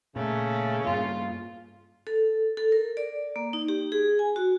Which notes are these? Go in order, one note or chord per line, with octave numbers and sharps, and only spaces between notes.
A#2 C#3 A3
G2 A#3 F4
A4
A4
A#4
D5
A#3
D#4
G4
G#4
G#5
F#4